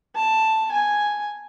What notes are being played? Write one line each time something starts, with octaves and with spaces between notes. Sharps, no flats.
A5
G#5